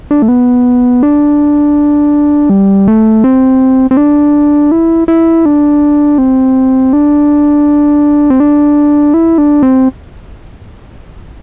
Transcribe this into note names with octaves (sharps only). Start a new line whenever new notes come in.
D4
A3
B3
D4
G3
A3
C4
C4
D4
E4
E4
D4
C4
D4
C4
D4
E4
D4
C4